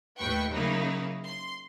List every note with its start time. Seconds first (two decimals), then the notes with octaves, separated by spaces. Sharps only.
0.19 D#2 A2 B4 G5 C#6
0.53 C#3 F#3 A#3 D#4 E4
1.27 C6